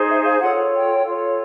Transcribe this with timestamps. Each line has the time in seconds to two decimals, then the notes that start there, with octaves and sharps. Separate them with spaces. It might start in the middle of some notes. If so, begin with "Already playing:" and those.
Already playing: D#4 G#4 C5
0.08 E5
0.24 F5
0.40 F4 A4 C#5 F#5
0.73 G5
1.05 F4 A4 C#5